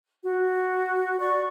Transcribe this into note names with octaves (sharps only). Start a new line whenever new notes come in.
F#4
D5 C#6